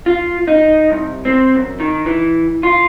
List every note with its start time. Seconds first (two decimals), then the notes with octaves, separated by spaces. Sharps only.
0.06 F4
0.47 D#4
0.90 C2
1.25 C4
1.56 F#2
1.80 D#3
2.06 E3
2.63 F4